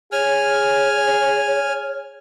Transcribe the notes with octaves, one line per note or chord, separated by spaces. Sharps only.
G#4 C#5 G#5 F6